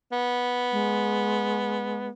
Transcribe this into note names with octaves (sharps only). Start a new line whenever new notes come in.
B3
G#3